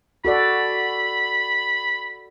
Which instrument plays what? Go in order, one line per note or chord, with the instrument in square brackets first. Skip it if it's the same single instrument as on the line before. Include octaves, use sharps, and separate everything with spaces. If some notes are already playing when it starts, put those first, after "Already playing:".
[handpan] F#4 A4 D5 [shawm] B5